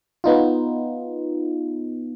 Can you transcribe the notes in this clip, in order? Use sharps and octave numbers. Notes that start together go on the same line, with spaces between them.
B3 D#4 F4